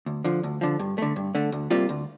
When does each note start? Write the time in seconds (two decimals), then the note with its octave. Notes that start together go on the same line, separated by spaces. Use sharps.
0.06 D2
0.24 D3 F3
0.43 D2
0.61 D3 F3
0.79 G2
0.98 D3 A3
1.16 G2
1.35 D3 A3
1.52 D2
1.71 C3 G3 A#3 F4
1.89 D2